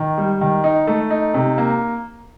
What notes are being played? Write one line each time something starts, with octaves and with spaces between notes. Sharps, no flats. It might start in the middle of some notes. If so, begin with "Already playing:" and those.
Already playing: D#3
G3
D#3
D#4
A3
D#4
C3
A#3